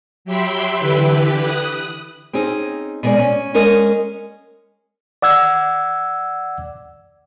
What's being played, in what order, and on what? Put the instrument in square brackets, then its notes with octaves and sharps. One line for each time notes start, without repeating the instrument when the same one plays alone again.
[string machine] F#3 G4 E5 G5 B5 C6
D3 E3 E4 G4 B4
D#6 F#6
[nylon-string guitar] C4 C#4 D#4 G#4
B2 G#3 D5
C#4
G#3 C#4 A#4 D#5
[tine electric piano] D5 F#5 E6 G#6